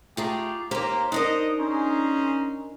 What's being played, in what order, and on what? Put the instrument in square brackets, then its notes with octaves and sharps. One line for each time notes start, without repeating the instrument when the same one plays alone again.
[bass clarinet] A3 [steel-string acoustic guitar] F4 G#4 A#5 [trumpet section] G4
[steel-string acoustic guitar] D#2 G4 [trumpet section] A#3 [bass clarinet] C5
[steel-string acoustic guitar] D4 D#4 A#4 [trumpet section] D#5
[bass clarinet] C#4 [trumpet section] G#4 C5 A#5